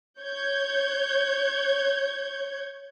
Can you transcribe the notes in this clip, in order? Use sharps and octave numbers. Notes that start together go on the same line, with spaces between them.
C#5 G6 G#6